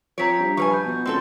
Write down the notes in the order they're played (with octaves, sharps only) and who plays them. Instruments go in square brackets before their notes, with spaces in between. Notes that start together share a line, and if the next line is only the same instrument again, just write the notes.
[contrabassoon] F3 [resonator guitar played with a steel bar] C4 C#5 [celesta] A#5 B6 D7
[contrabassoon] G2
[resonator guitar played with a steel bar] F3 F5 G#5 [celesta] B4 C#6
[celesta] B5 G6
[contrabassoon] B2
[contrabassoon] C#2 [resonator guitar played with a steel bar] C4 F#4 A4